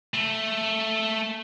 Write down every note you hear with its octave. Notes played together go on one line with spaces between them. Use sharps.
A3